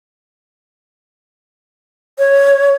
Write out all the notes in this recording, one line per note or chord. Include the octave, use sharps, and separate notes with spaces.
C#5